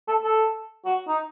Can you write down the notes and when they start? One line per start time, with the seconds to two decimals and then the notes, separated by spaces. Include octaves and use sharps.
0.08 A4
0.24 A4
0.86 F#4
1.08 D#4